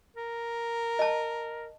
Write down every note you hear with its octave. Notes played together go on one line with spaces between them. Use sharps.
A#4
D#5 A5